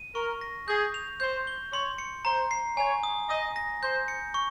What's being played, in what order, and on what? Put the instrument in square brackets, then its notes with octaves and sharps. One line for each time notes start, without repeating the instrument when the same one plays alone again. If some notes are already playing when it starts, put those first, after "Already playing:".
Already playing: [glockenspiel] D#7
[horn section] A#4 [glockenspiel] C#6
[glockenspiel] A#6
[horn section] G#4 [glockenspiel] G6
[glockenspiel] F7
[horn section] C5 [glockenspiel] G6
[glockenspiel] G7
[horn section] C#5 [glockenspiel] C6
[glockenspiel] C#7
[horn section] C5 [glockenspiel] A#5
[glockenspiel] C7
[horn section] C#5 [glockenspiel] G#5
[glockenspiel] D#6
[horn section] D#5 [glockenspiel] D#6
[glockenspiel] A#6
[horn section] C5 [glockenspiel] G6
[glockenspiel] C#7
C#6